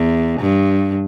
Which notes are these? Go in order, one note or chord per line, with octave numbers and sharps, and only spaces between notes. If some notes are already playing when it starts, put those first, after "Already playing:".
Already playing: E2
G2